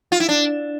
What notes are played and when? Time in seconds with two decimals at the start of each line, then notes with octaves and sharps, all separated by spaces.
0.12 F4
0.20 E4
0.29 D4